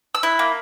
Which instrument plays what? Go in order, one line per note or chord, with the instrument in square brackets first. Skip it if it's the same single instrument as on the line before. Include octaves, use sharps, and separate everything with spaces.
[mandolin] E6
E4 F#6
A#3